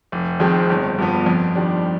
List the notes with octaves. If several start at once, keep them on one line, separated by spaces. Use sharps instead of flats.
F1
F2 D#3 G#3 C4
G1
G2 F3 B3
F2
D#3 G3 D4